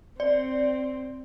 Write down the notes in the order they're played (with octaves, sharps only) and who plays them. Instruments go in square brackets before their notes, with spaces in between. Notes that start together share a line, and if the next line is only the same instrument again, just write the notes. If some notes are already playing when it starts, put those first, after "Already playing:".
[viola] C4 [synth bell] D5